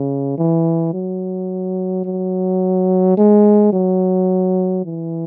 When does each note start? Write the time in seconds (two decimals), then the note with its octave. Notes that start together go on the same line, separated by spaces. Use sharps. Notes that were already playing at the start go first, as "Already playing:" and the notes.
Already playing: C#3
0.38 E3
0.94 F#3
2.05 F#3
3.17 G#3
3.73 F#3
4.85 E3